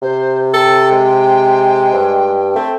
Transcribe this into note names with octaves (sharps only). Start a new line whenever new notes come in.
C3 C5
A4 G5
G#3
G2
A3 C4